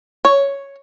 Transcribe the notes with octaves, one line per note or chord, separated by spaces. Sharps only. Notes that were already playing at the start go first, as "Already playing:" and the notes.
C#5